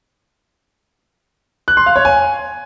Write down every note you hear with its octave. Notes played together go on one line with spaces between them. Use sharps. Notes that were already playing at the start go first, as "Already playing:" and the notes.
F#6
C6
F5
C#5
G#5